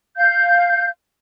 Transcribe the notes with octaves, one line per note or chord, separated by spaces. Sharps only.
F5 G6